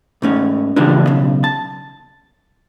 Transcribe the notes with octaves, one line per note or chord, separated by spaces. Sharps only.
G#2 A3 C#4
A2 C#3 E3 F3 G3 D4
B1 C#3
A5